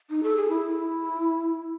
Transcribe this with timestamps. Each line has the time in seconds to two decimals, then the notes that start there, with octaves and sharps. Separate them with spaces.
0.10 D#4
0.23 A4
0.36 G#4
0.49 E4